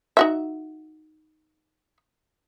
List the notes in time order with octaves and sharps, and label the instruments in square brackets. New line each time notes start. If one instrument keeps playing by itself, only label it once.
[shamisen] D#4 F#4 E5